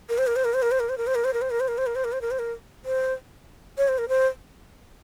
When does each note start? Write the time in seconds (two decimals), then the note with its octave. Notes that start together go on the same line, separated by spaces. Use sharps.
0.09 A#4
0.18 C5
0.27 A#4
0.36 C5
0.44 A#4
0.54 C5
0.62 A#4
0.71 C5
0.80 A#4
0.89 C5
0.98 A#4
1.07 C5
1.15 A#4
1.24 C5
1.33 A#4
1.42 C5
1.50 A#4
1.60 C5
1.68 A#4
1.78 C5
1.86 A#4
1.95 C5
2.04 A#4
2.12 C5
2.21 A#4
2.31 C5
2.39 A#4
2.85 C5
3.78 C#5
3.88 C5
3.98 A#4
4.09 C5